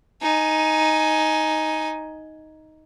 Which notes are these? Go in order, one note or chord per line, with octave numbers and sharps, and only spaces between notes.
D#4 G#5